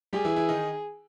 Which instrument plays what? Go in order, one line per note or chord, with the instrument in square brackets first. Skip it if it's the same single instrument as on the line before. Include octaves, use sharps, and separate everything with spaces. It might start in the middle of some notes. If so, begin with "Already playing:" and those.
[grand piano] G3 G4 [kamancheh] G#4
[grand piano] E3 E4
E3 E4
D#3 D#4